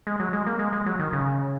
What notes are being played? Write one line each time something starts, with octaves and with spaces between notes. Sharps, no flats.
G#3
F#3
G#3
A#3
G#3
G#3
F#3
D#3
C#3